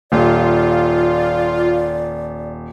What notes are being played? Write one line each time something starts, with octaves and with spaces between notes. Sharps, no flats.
D#1 F4 D5